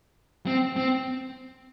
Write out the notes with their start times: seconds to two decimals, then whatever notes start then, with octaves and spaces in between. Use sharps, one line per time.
0.46 C4
0.76 C4